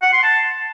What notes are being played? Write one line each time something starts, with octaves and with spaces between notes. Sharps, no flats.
F#5
C6
A5